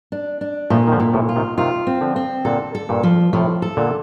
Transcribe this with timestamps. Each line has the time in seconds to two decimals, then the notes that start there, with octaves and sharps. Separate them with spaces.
0.12 D4
0.41 D4
0.70 A#2 F3 A3
0.87 D#3
0.92 D3 F3
1.00 A#2
1.14 A2 C3
1.29 F4
1.36 C3 D#3
1.58 C3 D#3 F4
1.87 C4
2.01 D3 F3
2.16 C4
2.45 A#2 D3 A4
2.75 A4
2.89 G2 A#2
3.03 F3
3.33 A2 C3 F3
3.62 A4
3.77 A#2 D3